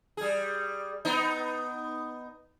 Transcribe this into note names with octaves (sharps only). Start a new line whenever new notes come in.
G3 G#4
B3 D#4